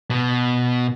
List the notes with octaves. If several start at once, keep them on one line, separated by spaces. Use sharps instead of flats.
B2